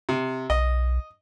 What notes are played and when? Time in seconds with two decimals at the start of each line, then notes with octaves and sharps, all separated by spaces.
0.09 C3
0.50 B1 D#5